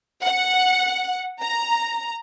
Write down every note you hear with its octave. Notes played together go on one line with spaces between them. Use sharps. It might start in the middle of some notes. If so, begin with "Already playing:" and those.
F#5
A#5